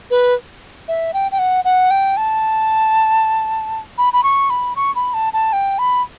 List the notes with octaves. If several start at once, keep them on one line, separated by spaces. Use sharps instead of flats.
B4
E5
G5
G5
F#5
F#5
G5
A5
B5
B5
C#6
B5
C#6
B5
A5
A5
G5
B5